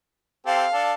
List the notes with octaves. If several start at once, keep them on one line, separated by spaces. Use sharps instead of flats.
C4 G4 A4 F5
D4 A4